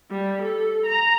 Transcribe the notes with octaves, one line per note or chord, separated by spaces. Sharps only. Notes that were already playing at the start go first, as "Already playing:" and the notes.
G3
A4
A#5